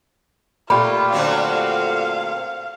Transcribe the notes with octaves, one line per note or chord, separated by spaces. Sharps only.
A#2 A3 F4 G4 B5
D3 F#3 C4 F5